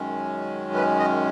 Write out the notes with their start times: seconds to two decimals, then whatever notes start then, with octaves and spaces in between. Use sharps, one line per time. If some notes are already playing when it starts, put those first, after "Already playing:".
Already playing: F#2 D#3 G#3 C#4
0.76 B4
0.99 D#5